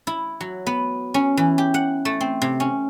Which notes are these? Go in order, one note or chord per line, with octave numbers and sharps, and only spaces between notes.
E4
F#3
B3
C#4
E3
G4
F#5
A3
C4
C3
C#4